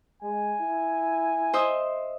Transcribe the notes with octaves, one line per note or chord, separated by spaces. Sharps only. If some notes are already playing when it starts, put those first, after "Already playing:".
G#3 G#5
E4
C5 D#5 E5